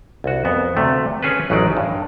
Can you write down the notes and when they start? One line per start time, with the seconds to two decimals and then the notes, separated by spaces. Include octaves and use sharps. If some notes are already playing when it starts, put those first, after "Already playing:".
0.24 C2 F#4
0.45 F2 B3
0.77 D2 C3 A3
1.22 C#4 G#4 A4 B4
1.50 A1 F#2 F#3 G#3 D#4 D5
1.77 G2